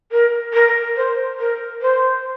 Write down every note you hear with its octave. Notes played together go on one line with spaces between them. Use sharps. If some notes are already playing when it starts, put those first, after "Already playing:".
A#4
A#4
C5
A#4
C5